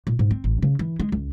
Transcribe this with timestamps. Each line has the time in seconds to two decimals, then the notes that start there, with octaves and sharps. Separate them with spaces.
0.07 A#2
0.19 G#2
0.31 C4
0.44 A1
0.62 C#3
0.79 E3
1.00 G#3
1.12 C#2